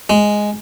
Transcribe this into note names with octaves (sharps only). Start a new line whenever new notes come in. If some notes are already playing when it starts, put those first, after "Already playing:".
G#3